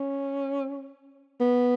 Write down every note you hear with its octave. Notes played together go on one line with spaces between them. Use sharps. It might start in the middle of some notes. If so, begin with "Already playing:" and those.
Already playing: C#4
B3